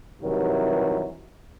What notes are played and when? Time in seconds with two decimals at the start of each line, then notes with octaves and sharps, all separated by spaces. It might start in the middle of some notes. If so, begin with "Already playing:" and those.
0.21 G2 C3 D#3 E3 F#3